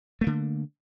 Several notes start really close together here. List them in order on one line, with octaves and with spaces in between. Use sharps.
A3 A#3 D3